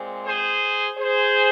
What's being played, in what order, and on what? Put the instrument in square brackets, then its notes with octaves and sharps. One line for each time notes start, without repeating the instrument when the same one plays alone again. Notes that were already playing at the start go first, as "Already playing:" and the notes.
Already playing: [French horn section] A#2 G#3 C4
G#4 C5
G#4 C5